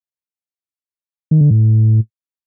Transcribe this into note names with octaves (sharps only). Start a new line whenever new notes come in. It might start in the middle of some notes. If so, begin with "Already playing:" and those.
D#3
D3
A2